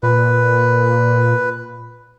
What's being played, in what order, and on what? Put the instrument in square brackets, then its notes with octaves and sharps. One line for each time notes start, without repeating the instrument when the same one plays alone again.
[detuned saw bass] A#2 [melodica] B4